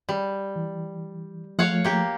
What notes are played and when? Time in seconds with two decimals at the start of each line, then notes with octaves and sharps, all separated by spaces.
0.09 G3
0.56 E3
1.59 F3 A3 C#5 F5 F#5
1.84 A#3 G4